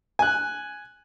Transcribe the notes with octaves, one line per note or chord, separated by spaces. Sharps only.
G#5 F#6